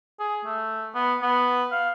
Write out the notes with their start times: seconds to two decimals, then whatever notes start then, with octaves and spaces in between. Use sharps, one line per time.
0.20 G#4
0.45 A3
0.95 B3
1.22 B3
1.72 F5